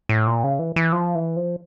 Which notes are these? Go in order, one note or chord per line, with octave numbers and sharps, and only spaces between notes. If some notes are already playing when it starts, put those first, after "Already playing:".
A2
A#2
C#3
E3
E3
F3
E3
F3